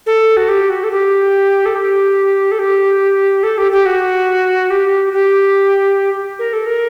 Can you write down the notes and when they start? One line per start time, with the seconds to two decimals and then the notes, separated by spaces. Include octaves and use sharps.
0.06 A4
0.37 F#4
0.49 G4
0.70 F#4
0.84 A4
0.91 G4
1.66 A4
1.75 G4
2.52 A4
2.59 G4
3.43 A4
3.58 G4
3.72 G4
3.86 F#4
4.70 G4
5.13 G4
6.39 A#4
6.53 A4
6.66 A#4